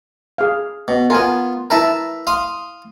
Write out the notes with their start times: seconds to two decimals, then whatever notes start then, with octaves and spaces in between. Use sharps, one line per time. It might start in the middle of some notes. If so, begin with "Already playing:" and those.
0.38 G#4 F5
0.88 B2
1.10 B3 F4 A#4 G#5
1.70 E4 A#4 B4 E5 A5 A#5
2.27 F5 C6 D#6